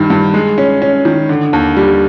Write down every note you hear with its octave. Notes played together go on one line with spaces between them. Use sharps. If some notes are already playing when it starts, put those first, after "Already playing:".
Already playing: G2 D#3 G3
G2
G#3
C#4
C#4
D#3
D3
D#2
G3